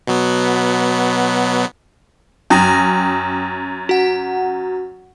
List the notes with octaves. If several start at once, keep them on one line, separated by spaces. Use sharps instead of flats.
B2 F#3 B3
F#2 G5 D#6 A#6
F#4 F#5